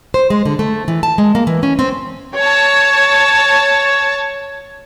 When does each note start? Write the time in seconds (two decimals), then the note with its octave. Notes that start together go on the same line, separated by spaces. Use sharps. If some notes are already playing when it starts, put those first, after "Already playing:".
0.14 C5
0.30 G#3
0.45 D3
0.59 A3
0.88 E3
1.03 A5
1.18 G#3
1.35 A#3
1.47 E3
1.63 C#4
1.79 C4
2.36 C#5 A5